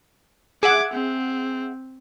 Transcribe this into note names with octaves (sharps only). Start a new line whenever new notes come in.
G#4 E5 F#5 D6 G#6
C4